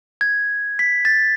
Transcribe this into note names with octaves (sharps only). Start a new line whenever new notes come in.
G#6
B6
A6